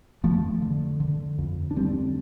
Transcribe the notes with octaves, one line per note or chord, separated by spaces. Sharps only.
F2 F3 A3
D3
D3
F2
D4
D2 G3 C4